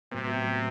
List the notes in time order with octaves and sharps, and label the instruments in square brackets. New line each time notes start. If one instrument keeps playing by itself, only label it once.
[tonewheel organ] A2 F#3 B3 [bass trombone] C3